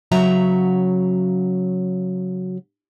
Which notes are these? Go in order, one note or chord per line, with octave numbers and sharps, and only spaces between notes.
C#3 F#3 F#4 E5 A#5